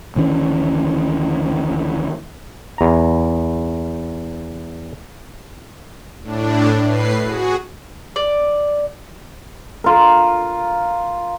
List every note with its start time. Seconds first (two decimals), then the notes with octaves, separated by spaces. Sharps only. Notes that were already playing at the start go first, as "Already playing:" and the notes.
0.16 D2 D#3 E3 C#4
2.78 E2 A#5
6.23 A2 D4
6.83 A2 B4 C7
7.24 F#4 G#4
8.16 D5
9.84 F4 A#4